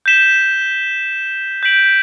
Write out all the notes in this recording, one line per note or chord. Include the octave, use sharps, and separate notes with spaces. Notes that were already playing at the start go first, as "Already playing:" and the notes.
G6 B6 E7 G7
G6 B6 D7 F#7